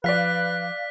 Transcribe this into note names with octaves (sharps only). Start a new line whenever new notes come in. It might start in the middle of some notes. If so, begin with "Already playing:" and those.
F3 B4 D5 F5 F#6 B6